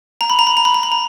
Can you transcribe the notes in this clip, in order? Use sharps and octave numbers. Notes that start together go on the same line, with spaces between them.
A#5
B5
A#5
B5
A#5
B5
A#5
B5
A#5